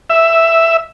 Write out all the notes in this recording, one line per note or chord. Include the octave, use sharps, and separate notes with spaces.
E5